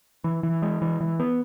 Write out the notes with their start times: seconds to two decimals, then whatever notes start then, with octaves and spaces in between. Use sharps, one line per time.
0.24 E3
0.43 E3
0.62 G#3
0.82 E3
1.00 E3
1.20 B3